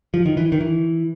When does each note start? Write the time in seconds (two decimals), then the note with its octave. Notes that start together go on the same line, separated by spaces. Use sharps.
0.14 F3
0.26 D#3
0.37 E3
0.52 D#3
0.61 E3